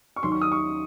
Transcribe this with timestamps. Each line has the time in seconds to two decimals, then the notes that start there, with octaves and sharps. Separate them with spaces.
0.16 C#6
0.23 D#2 D#3 F#3 C6
0.32 C#6
0.41 D#6
0.52 C#6